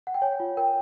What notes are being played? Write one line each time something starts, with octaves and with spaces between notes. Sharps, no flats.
F#5
G5
C#5 G#5
F4
A#4 G5